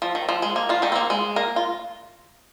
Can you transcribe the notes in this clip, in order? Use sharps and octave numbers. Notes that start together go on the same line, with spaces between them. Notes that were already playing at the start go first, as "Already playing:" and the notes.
F3
D#3
F3
G#3
A#3
F3 F4
D#3 D#4
C4
A#3
G#3
A#3 A#4
F4